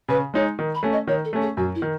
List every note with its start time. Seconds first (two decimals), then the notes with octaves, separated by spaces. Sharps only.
0.09 C#3 B4
0.34 G#3 D#4 C#5
0.59 D#3
0.74 B5
0.83 A3 C#4
0.92 D#5
1.07 D#3 C#5
1.24 A4
1.33 A3 C#4
1.41 G#4
1.57 F#2 F#4
1.75 E4
1.82 D#3